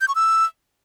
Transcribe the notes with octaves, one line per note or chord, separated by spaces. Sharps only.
G6
C#6
E6